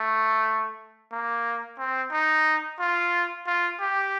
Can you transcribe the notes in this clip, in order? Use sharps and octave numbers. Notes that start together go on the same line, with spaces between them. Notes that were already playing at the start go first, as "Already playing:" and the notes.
Already playing: A3
A#3
C4
D#4
F4
F4
G4